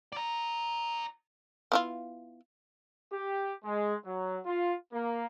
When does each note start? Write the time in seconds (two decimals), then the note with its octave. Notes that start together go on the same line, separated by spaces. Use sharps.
0.12 D5 A#5
1.72 B3 E4 F4
3.13 G4
3.65 G#3
4.05 F#3
4.46 F4
4.93 A#3